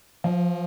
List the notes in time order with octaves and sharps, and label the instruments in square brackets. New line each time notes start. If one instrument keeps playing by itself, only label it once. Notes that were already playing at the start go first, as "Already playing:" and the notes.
[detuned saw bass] F3